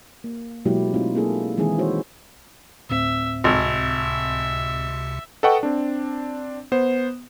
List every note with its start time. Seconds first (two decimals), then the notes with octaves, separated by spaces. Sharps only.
0.24 A#3
0.65 B2 F#3 G#3 A#3 E4 G4
0.94 A3 C4 D#4 F4
1.15 A#3 C4 D4 E4 G#4 A4
1.57 D#3 E3 G#3 C4 E4 G#4
1.78 D#4 E4 F#4 C5 C#5 E5
2.90 D2 A2 C4 E5
3.44 G#1 C#2 C3 E5
5.43 A4 B4 D#5 F#5 G5 C#6
5.63 C4 D4
6.72 B3 C5